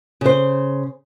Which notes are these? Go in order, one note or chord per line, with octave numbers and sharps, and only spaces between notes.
C#3 C5